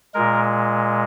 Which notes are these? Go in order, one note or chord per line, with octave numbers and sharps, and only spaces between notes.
A#2 G#3 A#4